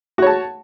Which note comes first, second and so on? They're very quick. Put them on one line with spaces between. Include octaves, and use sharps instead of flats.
F#4 C#5 A5